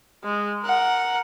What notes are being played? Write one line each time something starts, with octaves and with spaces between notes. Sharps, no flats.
G#3
A#4 F#5